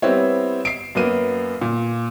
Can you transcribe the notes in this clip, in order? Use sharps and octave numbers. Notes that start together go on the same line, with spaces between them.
G3 B3 C4 E4 C#5
C7 D7
F#2 A#3 B3 D#7
A#2